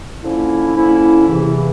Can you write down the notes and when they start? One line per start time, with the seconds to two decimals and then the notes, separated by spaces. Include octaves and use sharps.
0.23 D3 F3 A#3 C#4 E4
0.76 D3 F3 A#3 C#4 E4
1.28 E2 C3 E3